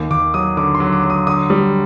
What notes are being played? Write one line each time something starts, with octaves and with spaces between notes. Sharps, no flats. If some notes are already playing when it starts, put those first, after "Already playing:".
Already playing: D#2
D#2 D6
F#3 D#6
D3 D6
C6
F#3
D6
F#3
D#6
D3 D#6
G3